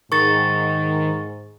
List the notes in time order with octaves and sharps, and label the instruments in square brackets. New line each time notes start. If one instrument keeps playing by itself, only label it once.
[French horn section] G#2 [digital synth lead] D#3 [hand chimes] C#6 A6